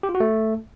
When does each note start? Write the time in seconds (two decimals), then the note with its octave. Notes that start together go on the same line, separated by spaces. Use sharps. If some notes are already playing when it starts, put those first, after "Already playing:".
0.03 G4
0.09 F4
0.15 F#4
0.20 A3